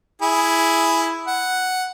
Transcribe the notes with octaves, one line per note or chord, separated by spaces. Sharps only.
E4 G#4
F#5